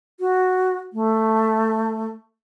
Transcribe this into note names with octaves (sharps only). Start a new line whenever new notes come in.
F#4
A3